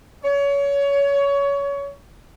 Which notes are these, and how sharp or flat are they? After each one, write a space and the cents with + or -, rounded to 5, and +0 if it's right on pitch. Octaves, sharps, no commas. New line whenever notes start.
C#5 +25